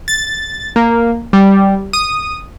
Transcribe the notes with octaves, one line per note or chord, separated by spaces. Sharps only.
A6
A#3
G3
D#6